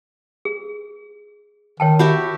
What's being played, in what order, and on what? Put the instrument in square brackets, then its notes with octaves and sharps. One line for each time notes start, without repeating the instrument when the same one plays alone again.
[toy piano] G#4
[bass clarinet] D#3 [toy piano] C#5 G5 A5
[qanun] F#4 G4 E5 [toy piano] B5